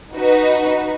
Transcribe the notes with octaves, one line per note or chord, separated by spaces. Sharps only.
D#4 F#4 B4